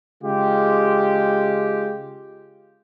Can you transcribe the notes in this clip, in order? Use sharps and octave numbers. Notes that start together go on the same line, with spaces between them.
C#3 G#3 F4 G4